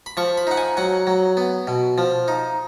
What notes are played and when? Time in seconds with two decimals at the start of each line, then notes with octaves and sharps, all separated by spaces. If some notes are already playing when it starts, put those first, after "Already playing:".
0.06 B5
0.17 F3 C#6
0.38 B5
0.47 D#4 F#5
0.57 G#5
0.77 F#3 F#5
1.07 F#3
1.37 B3
1.67 B2
1.98 F3
2.28 D#4